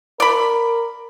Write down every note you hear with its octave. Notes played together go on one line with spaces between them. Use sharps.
A#4 D5 B5